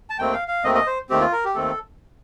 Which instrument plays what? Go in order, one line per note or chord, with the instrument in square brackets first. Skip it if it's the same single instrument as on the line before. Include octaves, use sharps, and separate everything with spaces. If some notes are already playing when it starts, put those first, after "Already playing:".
[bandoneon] A5
D#2 D#3 A3 C4 G5
F5
F5
D#2 D#3 A3 C4 D#5
D#5
C5
D#2 D#3 A3 C4 G4
F4
A#4
G4
D#2 D#3 A3 C4 A4